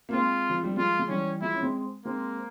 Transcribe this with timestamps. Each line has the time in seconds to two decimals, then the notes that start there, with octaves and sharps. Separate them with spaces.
0.09 A#3
0.13 G#3 C4 F4
0.50 F3
0.64 G3
0.77 F3 G#3 F4
0.99 G#3
1.09 E3 G3 C#4
1.41 F3 G#3 E4
1.54 C#4
1.63 G#3 C4
2.05 G#3 A#3 C4